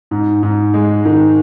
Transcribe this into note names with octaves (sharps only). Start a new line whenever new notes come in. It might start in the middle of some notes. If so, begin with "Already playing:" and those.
G#2
G#2
G#3
D#3